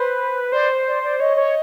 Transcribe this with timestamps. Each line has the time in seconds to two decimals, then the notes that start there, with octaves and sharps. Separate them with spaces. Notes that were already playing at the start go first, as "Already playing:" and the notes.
Already playing: B4 C5
0.52 C5 D5
0.87 D5
1.02 D5
1.20 C#5 D#5
1.37 C#5